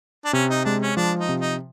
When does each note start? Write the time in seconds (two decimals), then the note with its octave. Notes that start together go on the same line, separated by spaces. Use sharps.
0.25 D4
0.33 C3 C#4
0.50 D#4
0.65 G#3 D4
0.82 C#4
0.97 F3 D4
1.19 D#4
1.29 C3
1.40 D#4